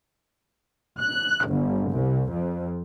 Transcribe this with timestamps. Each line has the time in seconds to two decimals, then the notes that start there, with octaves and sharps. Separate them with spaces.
1.01 F#6
1.47 G1
1.92 C2
2.31 F2